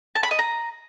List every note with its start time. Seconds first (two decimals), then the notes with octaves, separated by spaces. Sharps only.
0.15 A5
0.23 B5
0.31 D#5
0.39 A#5